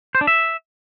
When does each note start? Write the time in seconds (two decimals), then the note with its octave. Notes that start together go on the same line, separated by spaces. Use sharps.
0.15 C5
0.21 D4
0.27 E5